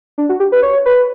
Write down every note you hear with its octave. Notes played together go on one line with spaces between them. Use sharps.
D4
F#4
G4
B4
C#5
B4